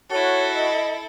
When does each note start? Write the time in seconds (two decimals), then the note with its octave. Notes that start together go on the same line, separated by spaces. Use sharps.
0.11 E4 F#4 A4 C#5
0.55 D#5